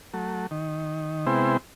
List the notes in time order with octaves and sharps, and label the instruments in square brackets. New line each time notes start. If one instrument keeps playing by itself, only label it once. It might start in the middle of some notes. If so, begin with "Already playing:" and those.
[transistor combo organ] F#3 A3
D#3
C3 G#3 B3 E4 C5 G5